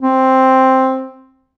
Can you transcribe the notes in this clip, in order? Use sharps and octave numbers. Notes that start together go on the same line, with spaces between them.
C4